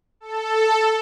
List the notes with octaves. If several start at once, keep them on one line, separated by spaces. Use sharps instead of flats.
A4